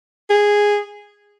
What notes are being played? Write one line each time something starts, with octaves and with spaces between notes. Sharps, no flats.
G#4